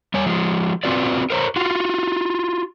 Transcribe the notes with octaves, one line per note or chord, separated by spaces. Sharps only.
G3 C#5 G#5
F3 G#3
C4 F4 F#4 B4 D5
A#4 C5 C#5 A#5
F4 F#4